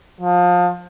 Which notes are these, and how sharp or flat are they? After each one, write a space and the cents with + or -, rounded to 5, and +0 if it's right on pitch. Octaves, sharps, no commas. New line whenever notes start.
F3 +25